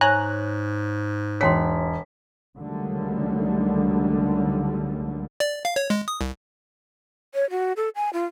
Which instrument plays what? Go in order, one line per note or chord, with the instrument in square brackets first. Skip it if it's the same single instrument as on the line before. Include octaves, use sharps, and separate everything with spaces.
[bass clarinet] G#2 [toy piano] C#5 C#6 [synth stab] G#5 A#5 F#6
[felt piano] E1 B6 [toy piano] C#5 G5 C6
[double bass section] C#2 D3 D#3 F#3 G3 A3
[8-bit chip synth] D5
F5
C#5
G#3
D#6
C2
[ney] C#5
F#4
A4
G#5
F4